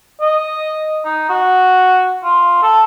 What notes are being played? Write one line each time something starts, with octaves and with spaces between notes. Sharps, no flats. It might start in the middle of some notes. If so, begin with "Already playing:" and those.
D#5
D#4
F#4
F4
A4